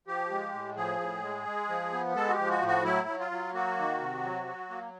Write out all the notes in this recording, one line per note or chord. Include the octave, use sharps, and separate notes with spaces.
F3 G4
G#3
A2
F3 G#4
A2
G#3
G#3
F3
B3
G#3 A4
F#4
G4
F3
F#4
A2
F#4
F#3 E4
F#3
F4
F#3
A#3 F#4
D#3
C3
F#3
F#3
A#3